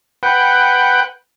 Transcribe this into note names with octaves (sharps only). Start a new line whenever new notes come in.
B4 F#5 G5